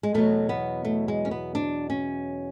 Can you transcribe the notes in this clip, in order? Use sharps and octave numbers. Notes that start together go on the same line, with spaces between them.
G#3
E2 B2 F#3 A3
B3
A3
G#3
C#4
B3
D4
C#4